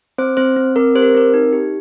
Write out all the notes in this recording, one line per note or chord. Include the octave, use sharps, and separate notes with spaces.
C4 C5
C4 C5
C4
C4 A#4
G4 C5
A#4
C4 A#4
D#4
G4